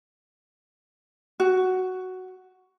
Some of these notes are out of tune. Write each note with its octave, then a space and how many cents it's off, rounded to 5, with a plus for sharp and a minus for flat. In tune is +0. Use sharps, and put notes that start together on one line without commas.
F#4 +5